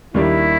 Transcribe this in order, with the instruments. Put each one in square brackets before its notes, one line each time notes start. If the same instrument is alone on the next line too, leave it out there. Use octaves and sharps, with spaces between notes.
[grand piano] D#2 D#3 G3 A#3 D4 [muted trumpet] E4